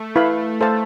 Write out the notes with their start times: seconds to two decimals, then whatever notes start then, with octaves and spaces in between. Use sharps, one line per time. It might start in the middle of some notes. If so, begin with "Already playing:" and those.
Already playing: A3
0.16 E4 B4 F5 B5
0.61 A4 C5 F5 A5